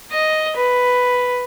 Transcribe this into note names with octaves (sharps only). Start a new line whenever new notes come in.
D#5
B4